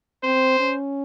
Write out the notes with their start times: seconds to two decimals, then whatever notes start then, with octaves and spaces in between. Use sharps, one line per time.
0.23 C4 C5
0.60 C#4